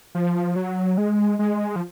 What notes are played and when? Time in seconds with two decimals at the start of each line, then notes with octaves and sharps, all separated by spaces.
0.15 F3
0.56 F#3
0.98 G#3
1.39 G#3
1.76 F3